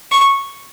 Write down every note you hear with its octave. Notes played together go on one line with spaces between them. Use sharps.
C#6